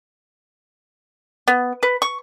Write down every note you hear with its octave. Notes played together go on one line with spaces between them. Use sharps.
B3
B4
C#6